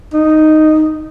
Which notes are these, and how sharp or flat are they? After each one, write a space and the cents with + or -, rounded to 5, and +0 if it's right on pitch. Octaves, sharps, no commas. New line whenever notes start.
D#4 -5